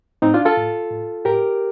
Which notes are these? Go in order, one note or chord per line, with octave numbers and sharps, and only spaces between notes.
A2 C4 D#4
D4 F4
F4 A4
A2
A2
A2 G4 A#4